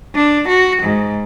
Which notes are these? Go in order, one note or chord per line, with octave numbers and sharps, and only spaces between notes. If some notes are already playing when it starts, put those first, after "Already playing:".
D4
F#4
G#2